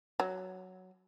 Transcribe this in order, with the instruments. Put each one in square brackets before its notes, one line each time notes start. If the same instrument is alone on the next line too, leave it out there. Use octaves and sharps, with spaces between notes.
[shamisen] F#3